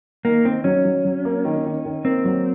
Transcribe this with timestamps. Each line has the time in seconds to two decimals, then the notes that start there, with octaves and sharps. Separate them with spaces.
0.25 D#3 A#3
0.45 D#3 C4
0.64 F#3 C#4
0.85 F#3
1.05 F#3
1.25 A#3
1.45 D#3
1.65 D#3
1.85 D#3
2.05 A#3 C4
2.25 F#3